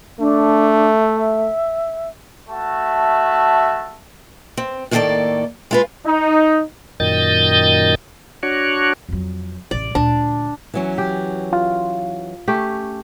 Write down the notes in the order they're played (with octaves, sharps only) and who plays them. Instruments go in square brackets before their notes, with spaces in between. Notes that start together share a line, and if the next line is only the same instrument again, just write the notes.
[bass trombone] A3 [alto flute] D4
[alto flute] E5
[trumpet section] A3 F#4 E5 A5
[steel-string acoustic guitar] C4
A2 D#3 A#3 G#4 A4 D5
G#3 F4 B4
[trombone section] D#4
[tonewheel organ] F#2 A#2 D#3 D#5 G6 A6
D4 F#4 C#5
[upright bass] F2 F#3
[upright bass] A1 C3 [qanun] D5
[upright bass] D2 A#2 [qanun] D4
[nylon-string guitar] E3 F#3 C#4
[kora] G4
[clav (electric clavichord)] F4
[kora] A3 C#4 G4